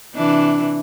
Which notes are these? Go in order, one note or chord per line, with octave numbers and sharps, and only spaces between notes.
C3 E3 D4